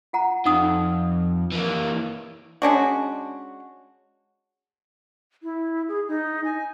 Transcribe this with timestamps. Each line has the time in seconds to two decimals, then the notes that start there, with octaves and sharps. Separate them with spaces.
0.13 F4 F#5 A#5
0.46 F2 D#4 F#5 D#6
1.52 E3 A#3
2.62 G#3 C#4 D4 F#4
5.43 E4
5.88 G#4
6.08 D#4
6.44 G#5